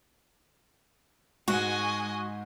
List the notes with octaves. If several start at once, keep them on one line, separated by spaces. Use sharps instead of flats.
G#2 G#3 F#4 D#5 G#5